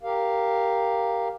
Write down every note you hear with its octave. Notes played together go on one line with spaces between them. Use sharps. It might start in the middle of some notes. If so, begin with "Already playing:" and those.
G4 A#4 F5